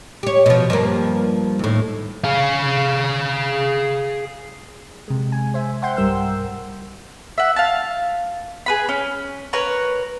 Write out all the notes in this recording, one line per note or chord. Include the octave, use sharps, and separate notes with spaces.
G4 C#5
B2 F3
G2 F3 A#3
D#2 A2
G#4 F5
C3 G#3
G#5
C5 E5
C5 E5 F#5 G5 C6 G6
B1 G2 G3 A#4 E6
E5 F#5
F5 A5
G#4 B4 B5
C#4
A#4 B4 C#5 A#5